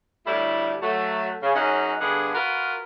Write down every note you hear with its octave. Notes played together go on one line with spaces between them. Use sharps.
D2 A2 G3 E4
F#3 A3
C#3
F#2 C#4 D#4 G#4 F#5
G2 D3 B3 G#4 F#5
F4 F#4 A#4 B4